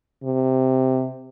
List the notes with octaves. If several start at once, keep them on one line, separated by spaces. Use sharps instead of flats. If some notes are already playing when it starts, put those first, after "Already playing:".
C3